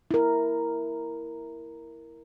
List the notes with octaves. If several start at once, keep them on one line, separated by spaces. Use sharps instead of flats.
E4 A#4